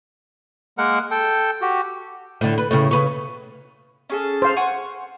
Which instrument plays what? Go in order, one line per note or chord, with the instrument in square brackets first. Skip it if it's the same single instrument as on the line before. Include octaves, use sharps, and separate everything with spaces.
[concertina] G#3 A#3 A#4 F#5
A4 G5
F#4 G4
[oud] A2 D3
B4
A2 C#3
C#3 B4 C#5
[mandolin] C#4 G#4 A4
[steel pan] C5 F5
[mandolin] F#5 G#5 C#6